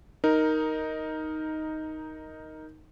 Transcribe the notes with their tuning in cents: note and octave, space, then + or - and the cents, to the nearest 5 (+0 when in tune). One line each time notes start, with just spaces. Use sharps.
D#4 +5 A#4 +0